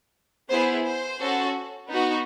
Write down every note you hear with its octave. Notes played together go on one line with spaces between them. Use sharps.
B3 E4 G#4 C5
C5
C#4 F#4 A4
B3 D#4 F#4